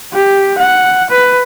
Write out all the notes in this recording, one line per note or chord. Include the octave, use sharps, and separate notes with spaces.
G4
F#5
B4